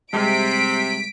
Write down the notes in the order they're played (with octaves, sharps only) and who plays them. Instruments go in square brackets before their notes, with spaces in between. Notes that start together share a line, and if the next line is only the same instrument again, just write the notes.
[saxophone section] C3 [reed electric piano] G3 G#3 [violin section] B6 D7